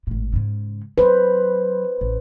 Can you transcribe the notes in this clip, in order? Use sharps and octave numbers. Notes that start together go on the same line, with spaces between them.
G#1 A2
G#2 C#3
F#3 B4 C5
A1